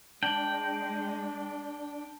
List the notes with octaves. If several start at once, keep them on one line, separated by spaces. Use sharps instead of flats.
G#3 D4 G5 A5 F#7